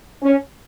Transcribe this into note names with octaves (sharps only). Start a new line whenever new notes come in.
C#4